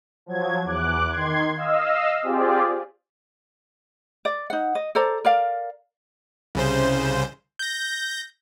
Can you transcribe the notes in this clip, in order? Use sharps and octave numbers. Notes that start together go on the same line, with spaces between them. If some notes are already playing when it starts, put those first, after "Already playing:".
F3 F#3 G#6
E2 D6 F#6
D#3 C6 G#6
D#5 F5 E6
C4 F4 G4 G#4 D5
D5
D#4 F#5
D#5
A4 C5 D5 A#5
A#4 D5 F5
C2 C#3 C5
G6 A#6